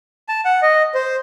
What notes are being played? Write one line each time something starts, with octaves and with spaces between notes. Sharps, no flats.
A5
F#5
D#5
C5